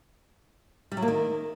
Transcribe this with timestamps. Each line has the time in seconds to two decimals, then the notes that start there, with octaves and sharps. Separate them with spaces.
0.92 G3
0.97 F#3
1.02 A#3
1.08 D#3